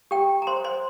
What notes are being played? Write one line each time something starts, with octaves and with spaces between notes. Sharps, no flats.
G4 G5
A#5
C5 C6
C5 C6